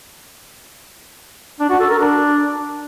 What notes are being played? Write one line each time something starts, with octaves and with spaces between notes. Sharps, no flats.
D4
F#4
A4
A#4
D4